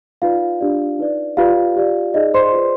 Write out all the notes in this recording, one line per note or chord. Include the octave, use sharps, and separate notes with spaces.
D#4 F4 B4 D5 F5
D4 G4 D5
D#4 B4 D5
F4 G4 B4 D5 F5
G4 D5
D#4 G#4 D5 D#5
C5 C6
F4 G#4 B4 D5